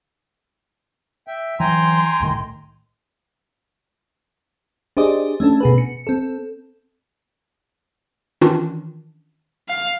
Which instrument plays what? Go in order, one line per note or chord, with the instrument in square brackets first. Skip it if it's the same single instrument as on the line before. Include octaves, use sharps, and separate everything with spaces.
[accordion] E5 G5
[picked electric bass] E3 F#3 [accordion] G5 G#5 A#5 [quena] C6
[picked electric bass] C2 A2 D#3
[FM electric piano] D4 G4 G#4 C5 D5 D#5
A3 C#4 D4 A4
B2 G#4 B4
C#7
C4 A4
[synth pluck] D#3 E3 C#4 D4 F4
[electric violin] F5